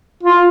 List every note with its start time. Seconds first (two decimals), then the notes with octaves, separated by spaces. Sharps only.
0.23 F4